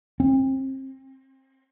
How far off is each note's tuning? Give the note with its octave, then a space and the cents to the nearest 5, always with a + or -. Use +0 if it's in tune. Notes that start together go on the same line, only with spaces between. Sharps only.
C4 +30